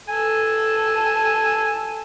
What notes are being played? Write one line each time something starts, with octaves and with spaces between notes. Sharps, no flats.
A4 G#5